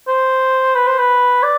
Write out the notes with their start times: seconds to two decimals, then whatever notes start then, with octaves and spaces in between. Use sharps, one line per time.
0.08 C5
0.75 B4
0.87 C5
0.98 B4
1.43 D5